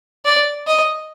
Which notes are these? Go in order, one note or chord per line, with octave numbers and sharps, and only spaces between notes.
D5
D#5